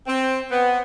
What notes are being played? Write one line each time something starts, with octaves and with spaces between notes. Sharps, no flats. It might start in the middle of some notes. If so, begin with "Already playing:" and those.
C4
B3